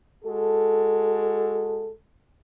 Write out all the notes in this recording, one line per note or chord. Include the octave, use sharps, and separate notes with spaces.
G#3 F#4 A4